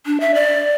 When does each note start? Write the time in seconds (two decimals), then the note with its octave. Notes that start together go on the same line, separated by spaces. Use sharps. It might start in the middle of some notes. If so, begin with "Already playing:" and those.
0.06 D4
0.20 E5
0.34 D5